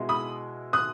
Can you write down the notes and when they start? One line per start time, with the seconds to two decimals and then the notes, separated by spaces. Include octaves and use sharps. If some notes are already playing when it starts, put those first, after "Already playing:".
Already playing: B2 G#3 B3 E4
0.09 B5 D#6
0.73 D#6 F#6